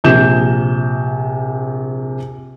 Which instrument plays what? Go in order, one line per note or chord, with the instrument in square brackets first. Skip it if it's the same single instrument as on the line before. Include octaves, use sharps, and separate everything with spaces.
[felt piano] A#1 C3 G6 E7